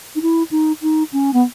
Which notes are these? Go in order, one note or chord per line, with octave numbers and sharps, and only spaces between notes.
D#4
E4
D#4
D#4
C#4
B3